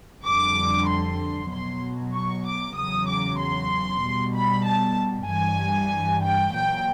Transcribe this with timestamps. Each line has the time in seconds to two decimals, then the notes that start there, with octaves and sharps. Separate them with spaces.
0.23 F2 D3 G3 D6
0.87 C6
1.49 B2 F#3 C6
2.13 C#6
2.44 D6
2.76 E2 C#3 F#3 D#6
3.07 D6
3.39 C6
4.03 B2 G3
4.35 B5
4.65 A5
5.29 G2 E3 G3 G#5
6.24 G5
6.55 A#2 F#3 G5